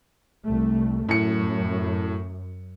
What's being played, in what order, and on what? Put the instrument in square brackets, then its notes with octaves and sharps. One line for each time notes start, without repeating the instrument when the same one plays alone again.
[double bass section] C2 A3
[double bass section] F#2 [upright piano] A2 C#7